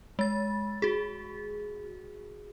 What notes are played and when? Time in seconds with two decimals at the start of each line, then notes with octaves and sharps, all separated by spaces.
0.19 G#3 A6
0.82 F#4 G#4